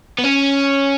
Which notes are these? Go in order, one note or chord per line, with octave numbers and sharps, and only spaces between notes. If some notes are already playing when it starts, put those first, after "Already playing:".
B3
C#4